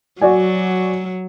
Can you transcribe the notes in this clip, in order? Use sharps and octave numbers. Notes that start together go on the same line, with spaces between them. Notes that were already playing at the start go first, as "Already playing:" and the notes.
F#3 F#4 D5 G#5